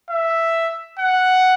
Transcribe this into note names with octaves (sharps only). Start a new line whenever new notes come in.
E5
F#5